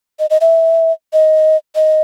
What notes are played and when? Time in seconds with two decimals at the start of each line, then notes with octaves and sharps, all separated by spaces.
0.19 D#5
0.30 D#5
0.41 E5
1.13 D#5
1.75 D#5